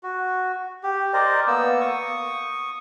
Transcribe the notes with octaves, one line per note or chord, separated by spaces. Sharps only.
F#4
G4
A#4 C5 D5 D#5
A#3 B3 E6
C#6 D#6